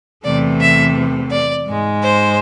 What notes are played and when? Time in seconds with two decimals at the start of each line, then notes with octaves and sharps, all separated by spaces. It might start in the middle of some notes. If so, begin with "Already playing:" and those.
0.24 E2 C3 E3 A3 D5
0.60 E5
1.31 D5
1.67 G#2 G#3
2.02 C5